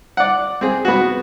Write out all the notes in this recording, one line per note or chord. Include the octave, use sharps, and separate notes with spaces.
D5 F#5
C4 G#4
B3 F#4